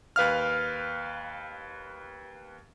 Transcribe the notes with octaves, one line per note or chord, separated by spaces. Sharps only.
D#2 B4 F5 F6